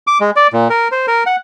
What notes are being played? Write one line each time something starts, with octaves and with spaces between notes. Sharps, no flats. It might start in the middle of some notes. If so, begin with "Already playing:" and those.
D6
G#3
D5
A#2
A#4
C5
A#4
F#5